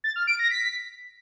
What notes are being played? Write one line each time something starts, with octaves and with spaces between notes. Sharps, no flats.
A6
F6
D7
A#6
B6